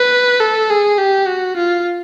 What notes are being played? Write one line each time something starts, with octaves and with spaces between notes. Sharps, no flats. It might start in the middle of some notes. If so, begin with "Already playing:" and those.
Already playing: B4
A4
G#4
G4
F#4
F4